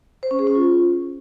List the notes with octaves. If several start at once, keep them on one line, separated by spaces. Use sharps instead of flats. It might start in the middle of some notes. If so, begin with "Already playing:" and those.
C5
C#4
G#4
C#4
F4